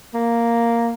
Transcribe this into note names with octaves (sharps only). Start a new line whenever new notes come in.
A#3